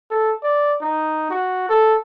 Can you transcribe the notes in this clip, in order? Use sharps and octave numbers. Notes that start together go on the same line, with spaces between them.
A4
D5
D#4
F#4
A4